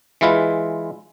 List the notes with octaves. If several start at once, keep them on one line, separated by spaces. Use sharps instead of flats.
E3 G#3 E4 F4 B4